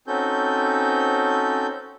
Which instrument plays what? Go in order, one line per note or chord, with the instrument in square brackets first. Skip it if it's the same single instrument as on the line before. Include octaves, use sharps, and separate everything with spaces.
[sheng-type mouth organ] C4 C#4 D#4 F#4 A4 G6